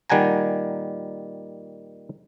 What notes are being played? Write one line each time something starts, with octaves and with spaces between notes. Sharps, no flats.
A#2 D#3 G3 F#5 G#5 A#5